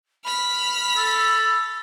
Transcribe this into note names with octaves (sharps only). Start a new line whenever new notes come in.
B5 F6 B6
A4 E6